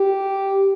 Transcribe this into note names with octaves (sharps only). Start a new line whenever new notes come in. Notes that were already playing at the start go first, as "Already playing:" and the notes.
Already playing: G4